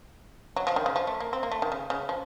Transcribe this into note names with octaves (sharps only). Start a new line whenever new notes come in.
F#3
F3
D#3
C#3
F3
A3
A#3
C4
A#3
A3
D#3
C#3
C#3
F3